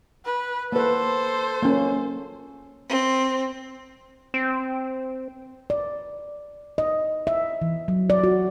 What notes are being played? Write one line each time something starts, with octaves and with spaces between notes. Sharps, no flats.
B4
A#3 A4 B4 C5
A#3 C#4
C4
C4
D5
D#5
E5
E3
F#3
D5
F#4